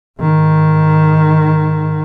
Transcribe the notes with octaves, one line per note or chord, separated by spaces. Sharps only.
G#2 D#3